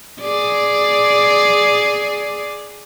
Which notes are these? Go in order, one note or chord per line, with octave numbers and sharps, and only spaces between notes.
G#4 D5